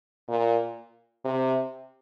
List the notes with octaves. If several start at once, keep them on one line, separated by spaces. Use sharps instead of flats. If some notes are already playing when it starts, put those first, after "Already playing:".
A#2
C3